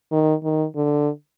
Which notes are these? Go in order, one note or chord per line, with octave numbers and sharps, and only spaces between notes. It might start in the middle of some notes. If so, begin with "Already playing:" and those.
D#3
D#3
D3